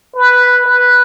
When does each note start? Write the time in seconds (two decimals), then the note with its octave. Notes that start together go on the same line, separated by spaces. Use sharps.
0.15 B4
0.66 B4